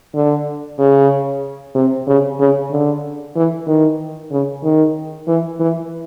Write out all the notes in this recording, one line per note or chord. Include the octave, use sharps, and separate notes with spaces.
D3
C#3
C3
C#3
C#3
D3
E3
D#3
C#3
D#3
E3
E3